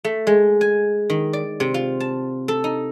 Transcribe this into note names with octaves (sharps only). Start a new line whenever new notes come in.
A3
G#3
G#5
D#3
D5
C3
F4
A5
A4
D#4